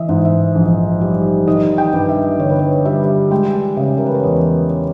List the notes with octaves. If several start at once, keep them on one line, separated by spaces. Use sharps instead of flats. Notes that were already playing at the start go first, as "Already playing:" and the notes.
Already playing: E3 D#5 E5
G#2
E5
A#1
G3
D#3 D#5
G5
G2
E5
G1 C#5
B4
C#5
G3 E5
G#3 G5
C#3 E5
A#4
B4
C#5
E2 D#5
C#5